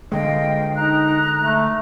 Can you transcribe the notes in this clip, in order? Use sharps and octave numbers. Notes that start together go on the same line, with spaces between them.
D3 G#3 D#5 F5 G5
D#4 A#5 F#6
A3